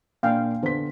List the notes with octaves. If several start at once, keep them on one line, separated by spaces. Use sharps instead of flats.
A#2 D4 F5 G5 G#5
D3 B3 C5 B6